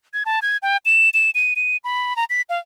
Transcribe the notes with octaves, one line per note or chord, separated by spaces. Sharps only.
G#6
A5
G#6
G5
E7
E7
D#7
D#7
B5
A#5
B6
F5